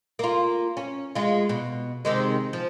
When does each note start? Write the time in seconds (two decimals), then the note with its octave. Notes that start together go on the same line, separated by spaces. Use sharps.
0.19 A#3 F4
0.77 C#4
1.15 G#3 F4
1.49 B2
2.05 C3 D#3 G#3
2.53 F3